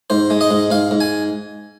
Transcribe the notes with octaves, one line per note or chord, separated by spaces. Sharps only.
G#2 C5
G#3
D#5
G#2
G#2 F5
G#2
G#5